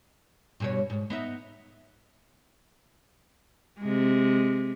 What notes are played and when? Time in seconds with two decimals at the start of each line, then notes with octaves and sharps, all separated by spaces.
0.60 G2 B2 C#5
0.90 G#2
1.10 B3 D#4 E5
3.80 C3 G#3